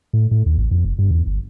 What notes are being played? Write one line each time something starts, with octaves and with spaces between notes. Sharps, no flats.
A2
A2
D#2
A1
F2
F1
G2
E2
G1